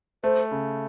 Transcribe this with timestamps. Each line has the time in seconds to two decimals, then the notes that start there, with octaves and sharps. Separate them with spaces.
0.24 A3 C5
0.51 C#3